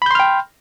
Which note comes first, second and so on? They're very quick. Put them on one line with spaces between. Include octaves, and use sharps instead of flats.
B5 G6 C6 F6 G5